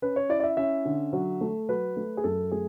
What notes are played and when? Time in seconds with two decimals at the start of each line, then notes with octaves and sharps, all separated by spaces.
0.02 C#4 B4
0.16 C#5
0.29 E4 D5
0.40 D5
0.44 E5
0.57 C#4 E5
0.85 D3
1.13 F#3
1.41 A3
1.69 F#3 B4
1.97 A3
2.17 G#4
2.24 F#2 A4
2.51 A3 G#4